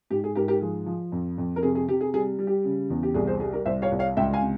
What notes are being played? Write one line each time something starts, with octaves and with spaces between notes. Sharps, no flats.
G#2 G4
G#4
G#2 G4 A#4
G4 A#4
F3 G#4
F3
F2
F2
A#4
C3 G#4
G#4
C3 G4
G#4
G3 G#4
G3
G4
C#3
E2
G4
C2 G#4
G#4 C5
G3 G#4
G4 A#4
C2 C5 E5
C#5 F5
C2
C#5 F5
C#2 E5 G5
F5 G#5
C3